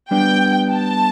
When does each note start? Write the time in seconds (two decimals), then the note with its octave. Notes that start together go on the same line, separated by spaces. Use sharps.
0.11 G3 B3 D4 G5
0.73 A5